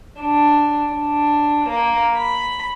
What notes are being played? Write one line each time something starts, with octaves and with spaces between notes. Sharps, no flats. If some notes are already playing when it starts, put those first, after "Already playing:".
D4
D4
A#3
B5